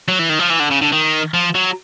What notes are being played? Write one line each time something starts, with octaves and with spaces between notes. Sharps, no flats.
F#3
E3
D#3
F3
E3
D3
C#3
D3
D#3
F3
F#3